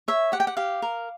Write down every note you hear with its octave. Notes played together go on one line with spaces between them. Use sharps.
C#5 E5
G4 F#5
G5
F#5
G4 F5
A#4